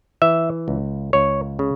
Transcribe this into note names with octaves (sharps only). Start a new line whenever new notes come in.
E3 E5
C#2
C#2 C#5
C#3